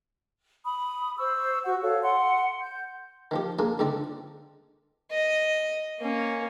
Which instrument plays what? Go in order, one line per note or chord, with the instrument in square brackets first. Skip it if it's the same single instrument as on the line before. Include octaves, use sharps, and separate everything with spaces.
[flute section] B5 D#6
C5 C#6 E6
F#4 F#5 C#6
A4 C#5 F5
F#5 C6
G6
[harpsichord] D#3 F3 G4
A#3 D4 F4 G#4
C#2 G#2 D3 C4 D5
[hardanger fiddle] D#5
A#3 C#4